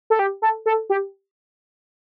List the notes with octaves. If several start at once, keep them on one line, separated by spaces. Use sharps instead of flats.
A4
G4
A4
A4
G4